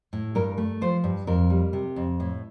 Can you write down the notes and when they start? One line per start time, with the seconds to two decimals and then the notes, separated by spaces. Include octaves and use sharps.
0.13 A2
0.35 G2 A#4
0.58 A3
0.81 F3 C5
1.04 G2
1.27 F2 A#4
1.50 G3
1.73 C3
1.96 F2
2.20 A2